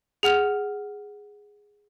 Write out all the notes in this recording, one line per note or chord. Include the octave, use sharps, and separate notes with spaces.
G#4 F#5 F6 F7